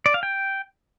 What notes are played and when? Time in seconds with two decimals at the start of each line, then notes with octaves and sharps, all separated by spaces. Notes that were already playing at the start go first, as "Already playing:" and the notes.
0.06 D5
0.14 F5
0.23 G5